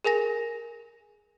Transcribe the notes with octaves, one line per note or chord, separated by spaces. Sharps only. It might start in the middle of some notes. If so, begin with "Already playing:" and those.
G#4 A#4 G#5 A#6